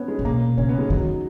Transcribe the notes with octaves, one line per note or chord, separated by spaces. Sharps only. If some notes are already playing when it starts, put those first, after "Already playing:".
Already playing: B3 C#4
G#3
A#2
B2 A#3
C#3 C#4
B3
G#3
D#3 F#3